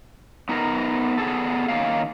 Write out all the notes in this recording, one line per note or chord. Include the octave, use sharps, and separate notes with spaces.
B3 D#4 A#4
B3 G#4 A4
D#3 F3 A#3 C#4 F5